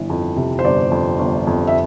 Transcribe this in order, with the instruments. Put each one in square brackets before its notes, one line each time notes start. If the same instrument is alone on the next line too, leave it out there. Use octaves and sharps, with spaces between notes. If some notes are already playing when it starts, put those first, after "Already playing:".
Already playing: [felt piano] G1 E3
F2
C3
C5
G1 D5
F2
G1
F2
E5